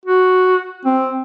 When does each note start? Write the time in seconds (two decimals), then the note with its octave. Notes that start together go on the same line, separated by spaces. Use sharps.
0.06 F#4
0.85 C4